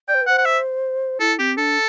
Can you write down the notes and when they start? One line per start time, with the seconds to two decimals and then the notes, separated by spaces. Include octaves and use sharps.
0.08 D5 G5
0.15 C5
0.22 B4
0.26 C5 F#5
0.38 F#5
0.45 E5
1.20 E4 A4
1.39 C4 G4
1.57 D4 A4